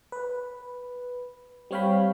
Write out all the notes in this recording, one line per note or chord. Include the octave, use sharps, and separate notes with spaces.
B4
G3 C4 C#5 F5 G5 B5